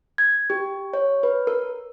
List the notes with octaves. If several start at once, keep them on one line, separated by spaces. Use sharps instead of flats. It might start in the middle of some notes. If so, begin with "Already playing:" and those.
G#6
G4
C#5
B4
A#4